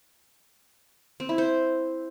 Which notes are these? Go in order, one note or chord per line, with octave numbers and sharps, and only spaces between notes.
C4
E4
C5